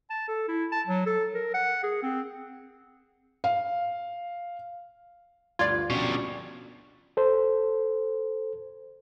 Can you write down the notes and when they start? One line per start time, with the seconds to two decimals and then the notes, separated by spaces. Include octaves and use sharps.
0.10 A5
0.28 A4
0.48 E4
0.72 A5
0.87 F#3
1.06 A4
1.34 A#4
1.54 F#5
1.83 G#4
2.02 C4
3.44 F5
5.59 D2 G2 F4 D5 G#6
5.90 B2 G3 C#4 D4 F#4 C#6
7.17 A4 C5